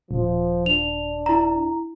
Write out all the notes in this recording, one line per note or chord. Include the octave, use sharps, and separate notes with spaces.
D#1 F3
D4 F7
E4 A#5